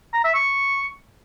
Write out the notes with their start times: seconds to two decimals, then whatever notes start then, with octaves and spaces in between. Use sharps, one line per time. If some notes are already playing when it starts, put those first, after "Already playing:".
0.14 A#5
0.24 E5
0.35 C#6